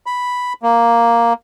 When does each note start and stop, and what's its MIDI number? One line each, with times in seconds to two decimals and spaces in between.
0.06 0.53 83
0.63 1.33 58